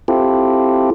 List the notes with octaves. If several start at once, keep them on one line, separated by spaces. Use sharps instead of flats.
C4 E4 F4 G4 A4